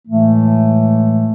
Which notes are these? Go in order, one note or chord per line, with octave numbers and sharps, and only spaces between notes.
A2 E3 G#3 A3